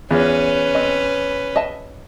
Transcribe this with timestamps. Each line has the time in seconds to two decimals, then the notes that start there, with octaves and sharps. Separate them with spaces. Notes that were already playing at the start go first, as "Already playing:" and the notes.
0.11 E2 C#4 F4 B4
0.75 C4 D#5
1.56 D#5 E5 A5